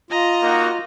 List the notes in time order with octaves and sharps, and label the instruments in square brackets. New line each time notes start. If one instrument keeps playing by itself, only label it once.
[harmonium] F4 [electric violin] D#5 A#5
[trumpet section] A#3 D#4 F#4